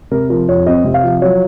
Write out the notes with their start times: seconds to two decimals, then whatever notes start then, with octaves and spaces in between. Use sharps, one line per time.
0.11 C3 A#4
0.30 F3 A#4
0.49 F2 C#5
0.66 C4 D#5
0.84 C3
0.94 F5
1.03 F3
1.22 F#3 C#5